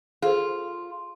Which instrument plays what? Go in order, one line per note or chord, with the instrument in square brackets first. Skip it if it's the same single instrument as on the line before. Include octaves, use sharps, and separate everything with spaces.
[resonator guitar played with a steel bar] F4 [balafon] G#4 A4 C5